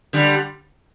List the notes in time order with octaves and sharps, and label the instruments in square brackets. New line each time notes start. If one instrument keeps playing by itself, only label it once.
[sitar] D3 G3